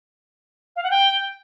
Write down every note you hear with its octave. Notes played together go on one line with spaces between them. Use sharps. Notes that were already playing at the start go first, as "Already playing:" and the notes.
F5
F#5
G5